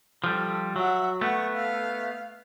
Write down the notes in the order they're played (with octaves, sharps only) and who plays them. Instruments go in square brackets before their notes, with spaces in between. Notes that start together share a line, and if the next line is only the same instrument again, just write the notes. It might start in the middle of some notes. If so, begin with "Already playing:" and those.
[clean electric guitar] F3 G3 [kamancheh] A4
[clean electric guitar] F#3 [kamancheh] E5 F#5
[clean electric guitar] A3 B3 [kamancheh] F#5 C#6
[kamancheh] F5